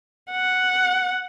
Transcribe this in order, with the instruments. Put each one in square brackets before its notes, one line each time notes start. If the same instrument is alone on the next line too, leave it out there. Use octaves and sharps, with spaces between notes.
[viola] F#5